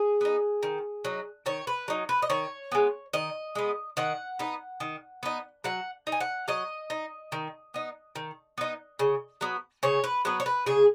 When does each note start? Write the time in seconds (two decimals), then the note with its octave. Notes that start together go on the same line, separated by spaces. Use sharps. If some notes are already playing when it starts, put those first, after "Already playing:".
Already playing: G#4
0.21 B3 D#4
0.63 D#3
1.05 F#3 D#4
1.46 D#3 C#5
1.67 B4
1.88 F#3 D#4
2.09 B4
2.22 D#5
2.30 D#3 C#5
2.72 G#3 B3
3.13 D#3 D#5
3.55 G#3 B3
3.97 D#3 F#5
4.39 B3 D#4
4.80 D#3
5.23 B3 D#4
5.64 F#3 F#5
6.07 D#4
6.12 G#5
6.21 F#5
6.48 F#3 D#5
6.90 D#4
7.32 D#3
7.74 B3 D#4
8.16 D#3
8.58 B3 D#4
8.99 C#3
9.41 F#3 B3
9.83 C#3 C#5
10.04 B4
10.25 F#3 B3 B4
10.40 C#5
10.46 B4
10.66 C#3 G#4